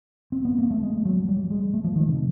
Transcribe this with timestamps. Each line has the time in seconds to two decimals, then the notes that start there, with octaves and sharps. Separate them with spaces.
0.32 C4
0.45 B3
0.58 A#3
0.71 A3
0.83 G#3
1.05 F#3
1.29 G3
1.51 G#3
1.74 A3
1.84 F3
1.96 D#3
2.08 C3